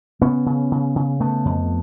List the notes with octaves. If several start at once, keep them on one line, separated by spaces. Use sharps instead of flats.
C#3 B3 C#4
C#3
C#3
C#3
C#3 A3 B3
F2